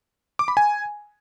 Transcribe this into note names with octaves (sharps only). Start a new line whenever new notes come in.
D6
B5
G#5